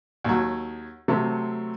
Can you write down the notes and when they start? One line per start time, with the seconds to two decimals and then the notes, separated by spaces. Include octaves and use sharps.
0.24 D#2 F#3
1.08 C3 F#3 A3 C4